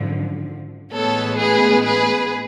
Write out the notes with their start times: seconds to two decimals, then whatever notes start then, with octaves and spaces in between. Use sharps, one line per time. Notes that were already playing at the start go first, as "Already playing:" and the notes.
Already playing: G#1 F#2 D3 F3
0.93 A1 A2 G#3 B3 A4 C#5
1.38 G#4 B4
1.84 G#4 B4